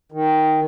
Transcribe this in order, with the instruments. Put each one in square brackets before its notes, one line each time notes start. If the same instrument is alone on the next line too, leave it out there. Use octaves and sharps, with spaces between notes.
[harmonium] D#3